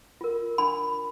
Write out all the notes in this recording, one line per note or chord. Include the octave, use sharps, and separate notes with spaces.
F4 A#4
D4 B5